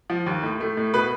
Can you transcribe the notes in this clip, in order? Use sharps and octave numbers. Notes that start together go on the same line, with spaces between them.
F3
D#2
A2
A3
A2
B2 B4